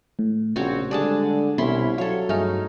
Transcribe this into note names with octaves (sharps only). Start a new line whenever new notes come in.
A2
A#1 C#3 C4 F#4 C#5
D3 G3 G#3 D4 G#4 A5
C2 B2 C#4 E4 B5 C6 B6
F#3 A4 C#5 F5
G2 A3 D#4 G#4 F6